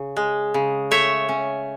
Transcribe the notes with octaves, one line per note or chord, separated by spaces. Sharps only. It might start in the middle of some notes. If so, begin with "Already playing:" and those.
Already playing: C#3
G#3
C#3
A3 C#5 E5
C#4